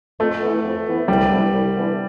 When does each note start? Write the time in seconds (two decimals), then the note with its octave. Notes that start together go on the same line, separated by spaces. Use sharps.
0.20 F2 A3
0.42 E3 B3
0.64 F2
0.87 E3 B3
1.08 C2 G3
1.31 C3 E3 B3 D4
1.53 C2
1.76 C3 E3 B3 D4